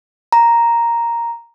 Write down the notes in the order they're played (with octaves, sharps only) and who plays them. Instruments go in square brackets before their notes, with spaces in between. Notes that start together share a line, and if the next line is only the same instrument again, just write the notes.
[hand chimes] A#5